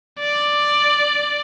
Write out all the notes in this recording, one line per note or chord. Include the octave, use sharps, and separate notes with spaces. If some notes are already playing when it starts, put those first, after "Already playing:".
D5